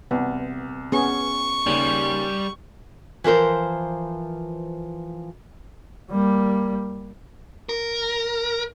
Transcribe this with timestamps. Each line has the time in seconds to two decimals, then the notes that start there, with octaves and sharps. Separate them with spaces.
0.11 C2 B3
0.92 B3 C#4 G#4 C#6
1.66 D#2 C#3 G3
3.24 E3 F3 A#4 C5
6.11 G3 A#3
7.69 A#4